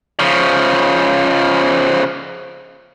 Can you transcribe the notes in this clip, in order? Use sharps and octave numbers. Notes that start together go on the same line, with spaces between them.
C#3 F3